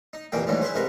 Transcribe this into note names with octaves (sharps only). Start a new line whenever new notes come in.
D#4
C2 F2 A#2 E3 A#3 G5
D2 G#2 D#3 E3 F#3 G3
E4 G#4 B4 C5
G#2 C3 A#4 B4 F5